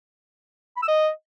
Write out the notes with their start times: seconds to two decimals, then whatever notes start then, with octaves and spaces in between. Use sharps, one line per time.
0.77 B5
0.82 E6
0.88 D#5